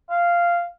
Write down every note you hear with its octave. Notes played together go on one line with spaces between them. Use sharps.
F5